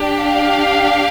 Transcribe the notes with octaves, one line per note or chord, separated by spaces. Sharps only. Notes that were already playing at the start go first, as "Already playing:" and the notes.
Already playing: D4 G4
F5